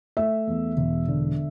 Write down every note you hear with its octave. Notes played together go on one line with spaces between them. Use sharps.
A3 E5
E2
E1
D3